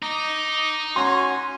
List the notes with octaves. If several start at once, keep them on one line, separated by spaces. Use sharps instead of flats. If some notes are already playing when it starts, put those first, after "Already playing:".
D#4 D6
C#4 F#4 G#5 C6